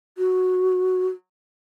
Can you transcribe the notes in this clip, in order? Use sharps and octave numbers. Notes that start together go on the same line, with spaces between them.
F#4